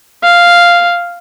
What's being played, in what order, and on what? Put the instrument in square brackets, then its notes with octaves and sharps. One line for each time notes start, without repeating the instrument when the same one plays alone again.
[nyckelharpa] F5